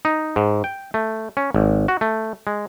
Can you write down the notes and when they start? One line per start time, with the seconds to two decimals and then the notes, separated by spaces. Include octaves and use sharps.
0.05 D#4
0.36 G#2
0.64 G5
0.94 A3
1.37 C#4
1.54 G#1
1.88 F#4
2.01 A3
2.47 G#3